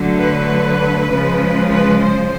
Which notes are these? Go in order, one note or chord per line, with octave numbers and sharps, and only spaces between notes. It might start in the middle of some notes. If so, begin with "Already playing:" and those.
Already playing: D3 F#3 A3
B4
C#3 F3 G#3
B4
C5